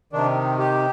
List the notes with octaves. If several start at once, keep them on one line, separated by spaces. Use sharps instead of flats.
C3 D#3 D4
G4